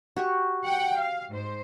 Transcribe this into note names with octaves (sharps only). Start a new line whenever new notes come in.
F#4 G4 C#6
F#5 G5
F5
G#2 C5